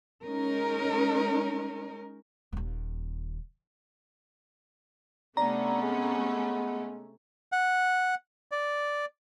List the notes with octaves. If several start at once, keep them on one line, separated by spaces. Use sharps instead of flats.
G#3 C#4 D#4 A#4
D#1 D#2
C3 A3 B3 C#4 D4 A#5
G#3
F#5
D5